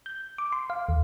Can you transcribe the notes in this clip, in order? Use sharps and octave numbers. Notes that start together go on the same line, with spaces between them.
G6
D6
C6
F5
D#2